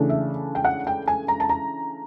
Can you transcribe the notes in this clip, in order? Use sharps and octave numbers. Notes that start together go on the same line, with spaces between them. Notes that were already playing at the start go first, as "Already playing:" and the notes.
Already playing: C#3 E3 A3 D4
E5
G5
F#5
G5
G#5
A#5
A5
A#5